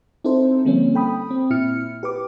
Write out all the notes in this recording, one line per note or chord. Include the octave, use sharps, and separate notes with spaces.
C4 D#4 E4 A4 C5
D3 F3 G3 A#3 C4 C#4
A4 G5 B5 D#6
C4
A#2 E4 F6 C#7
G4 B4 D6